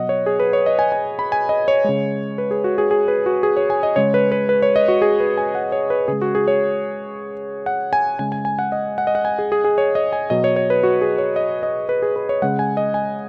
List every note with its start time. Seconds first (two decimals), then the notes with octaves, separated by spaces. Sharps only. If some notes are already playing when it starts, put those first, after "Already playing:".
Already playing: B2 F#3 D#5 F#5
0.09 C#5
0.26 G#4
0.40 B4
0.53 C#5
0.66 D#5
0.79 G#5
0.92 G#5
1.19 B5
1.32 G#5
1.49 D#5
1.68 C#5
1.84 C#3 G#3
2.38 B4
2.51 G#4
2.64 F#4
2.78 G#4
2.91 G#4
3.08 B4
3.26 F#4
3.43 G#4
3.57 C#5
3.70 G#5
3.83 D#5
3.96 C#3 G#3 C#5
4.14 B4
4.32 B4
4.49 B4
4.62 C#5
4.76 D#5
4.88 F#4
5.02 G#4
5.20 B4
5.37 G#5
5.55 F#5
5.72 C#5
5.90 B4
6.08 C#3 G#3 G#4
6.22 F#4
6.35 G#4
6.48 C#5
7.66 F#5
7.93 G#5
8.19 C#3 G#3 G#5
8.32 G#5
8.45 G#5
8.59 F#5
8.72 D#5
8.98 F#5
9.07 D#5
9.15 F#5
9.25 G#5
9.39 G#4
9.52 G#4
9.64 G#4
9.78 C#5
9.95 D#5
10.13 G#5
10.30 B2 F#3 D#5
10.44 C#5
10.56 C#5
10.70 B4
10.83 F#4
11.01 G#4
11.18 C#5
11.36 D#5
11.63 D#5
11.89 B4
12.02 G#4
12.16 B4
12.29 C#5
12.42 C#3 G#3 F#5
12.59 G#5
12.77 D#5
12.94 G#5